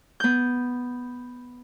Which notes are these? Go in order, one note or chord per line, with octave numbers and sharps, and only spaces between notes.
B3 G6